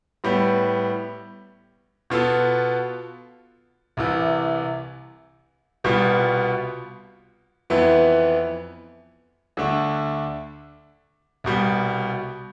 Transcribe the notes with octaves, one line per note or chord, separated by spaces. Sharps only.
A2 G3 B3
B2 B3 F4 A4
C2 C3 E3
C2 B2 G3 B3 F4
F2 E3 B3 E4
D2 D3 A3 D4
C2 B2 G3